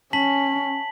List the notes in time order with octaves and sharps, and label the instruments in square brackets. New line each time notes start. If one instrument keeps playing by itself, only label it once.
[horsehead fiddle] C#4 [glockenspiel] A5 B6 F#7